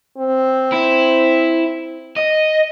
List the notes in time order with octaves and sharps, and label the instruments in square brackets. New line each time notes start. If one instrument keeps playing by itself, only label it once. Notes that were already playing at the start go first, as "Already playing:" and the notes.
[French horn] C4
[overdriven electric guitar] E4
D#5